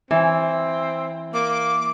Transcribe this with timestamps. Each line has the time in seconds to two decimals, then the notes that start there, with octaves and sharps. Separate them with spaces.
0.11 E3 C4
1.34 A#3 D6